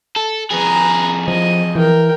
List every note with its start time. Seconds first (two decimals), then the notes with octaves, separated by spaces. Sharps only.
0.16 A4
0.51 F2 G#4 B4 A#5
1.28 F3 D#5
1.75 E3 A#4 G5